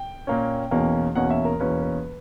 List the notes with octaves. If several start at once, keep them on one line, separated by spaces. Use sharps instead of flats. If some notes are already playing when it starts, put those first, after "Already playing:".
Already playing: G5
A#2 A#3 C#4
E2 B2 A#3 C#4
E2 B2 A#3 C#4 F#5
E5
A#4
E2 B2 A#3 C#4 B4
B4